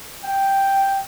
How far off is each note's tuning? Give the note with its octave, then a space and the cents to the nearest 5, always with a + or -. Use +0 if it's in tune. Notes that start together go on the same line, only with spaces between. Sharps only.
G5 +0